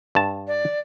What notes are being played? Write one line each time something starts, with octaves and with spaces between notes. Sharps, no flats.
G2 A5
D5